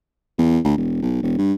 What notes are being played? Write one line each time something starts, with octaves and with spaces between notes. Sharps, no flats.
E2
D2
E1
B1
E1
G2